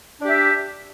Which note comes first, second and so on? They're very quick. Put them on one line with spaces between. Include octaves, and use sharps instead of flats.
D4 G4 E5